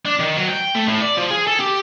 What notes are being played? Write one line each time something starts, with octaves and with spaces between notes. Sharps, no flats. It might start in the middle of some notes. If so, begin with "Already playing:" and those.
D4
D#3
F#3
G5
A3
A2
D5
F3
G#4
A4
G4